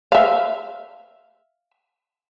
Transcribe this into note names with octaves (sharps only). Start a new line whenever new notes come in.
E5 F5